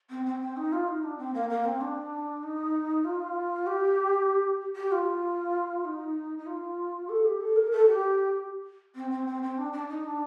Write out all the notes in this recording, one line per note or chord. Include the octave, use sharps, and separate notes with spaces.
C4
C4
C4
D#4
F4
D#4
D4
C4
A#3
A#3
C4
D4
D#4
F4
G4
G4
F4
D#4
D#4
F4
A4
G4
A4
A#4
A4
G4
C4
C4
C4
C4
D4
D4
D#4
D4